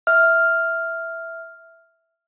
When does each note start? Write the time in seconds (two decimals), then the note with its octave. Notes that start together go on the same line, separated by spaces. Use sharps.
0.07 E5 F6